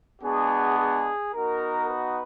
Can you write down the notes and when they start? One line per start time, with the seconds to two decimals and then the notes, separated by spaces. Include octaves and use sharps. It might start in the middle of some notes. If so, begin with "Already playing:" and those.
0.22 G#3 B3 D4 F#4 G#4
0.77 G#4
1.32 B3 D#4 F#4 A#4
1.88 B4